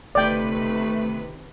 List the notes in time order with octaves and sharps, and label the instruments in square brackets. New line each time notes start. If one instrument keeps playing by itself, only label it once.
[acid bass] G1 [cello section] C3 D#3 B4 [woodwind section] A3 [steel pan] D5 G5